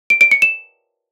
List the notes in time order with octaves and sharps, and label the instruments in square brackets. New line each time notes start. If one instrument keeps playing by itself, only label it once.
[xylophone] D7
D7
C#7
E7